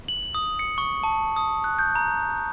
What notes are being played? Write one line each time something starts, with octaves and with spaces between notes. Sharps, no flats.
F#7
D#6
C#7
C#6
A5
D#6
F#6
G6
A#5